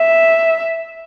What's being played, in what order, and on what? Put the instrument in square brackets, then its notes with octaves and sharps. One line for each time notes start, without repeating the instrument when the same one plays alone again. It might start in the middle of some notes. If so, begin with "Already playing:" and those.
Already playing: [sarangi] E5